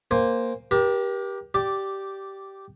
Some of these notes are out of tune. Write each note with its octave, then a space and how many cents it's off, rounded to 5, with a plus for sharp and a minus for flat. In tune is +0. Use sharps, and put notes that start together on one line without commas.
A#3 +0 C5 +0 G#5 -30
G4 +0 A#4 +40 A5 +25
G4 -10 D5 +0